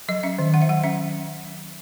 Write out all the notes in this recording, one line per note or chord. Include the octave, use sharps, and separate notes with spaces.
F#3 D#5
C#4 E5
D#3
D#3 F#5
E5
F#3 F#5
C#4 E5